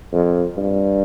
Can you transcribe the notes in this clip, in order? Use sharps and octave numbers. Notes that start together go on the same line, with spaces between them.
F2
G2